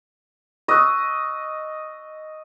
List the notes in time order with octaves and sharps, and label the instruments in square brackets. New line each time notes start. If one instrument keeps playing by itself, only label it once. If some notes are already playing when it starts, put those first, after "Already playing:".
[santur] D#5 [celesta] C#6 E6 F#6